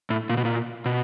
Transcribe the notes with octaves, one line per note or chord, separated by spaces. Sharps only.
A2
A#2
B2
A#2
B2